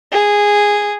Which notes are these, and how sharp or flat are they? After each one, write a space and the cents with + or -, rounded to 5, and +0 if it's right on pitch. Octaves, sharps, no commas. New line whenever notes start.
G#4 -10